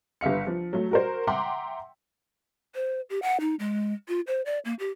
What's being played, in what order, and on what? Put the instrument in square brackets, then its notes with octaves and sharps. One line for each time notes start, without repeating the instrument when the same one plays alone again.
[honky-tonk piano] G1 B4 E5 F5 C#7
F3
F#3 A3
F#4 A#4 C5
E5 F#5 G5 A#5 C6 D6
[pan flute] C5
G4
F#5
D#4
G#3
F4
C5
D5
A#3
G4